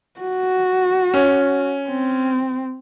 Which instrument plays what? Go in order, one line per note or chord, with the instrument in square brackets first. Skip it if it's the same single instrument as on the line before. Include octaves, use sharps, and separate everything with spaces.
[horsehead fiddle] F#4
[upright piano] C#4
[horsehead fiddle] C4